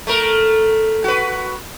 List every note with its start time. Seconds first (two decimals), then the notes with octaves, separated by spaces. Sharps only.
0.07 A3 A#4
1.04 F#4 B4